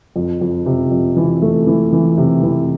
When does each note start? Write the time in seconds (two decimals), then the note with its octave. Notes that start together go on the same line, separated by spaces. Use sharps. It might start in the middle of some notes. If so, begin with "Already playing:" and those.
0.16 F2
0.41 F2
0.66 C3
0.91 F2
1.16 E3
1.42 A3
1.67 E3
1.92 E3
2.18 C3
2.43 E3